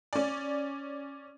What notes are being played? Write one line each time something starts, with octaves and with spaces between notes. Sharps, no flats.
C#4 D5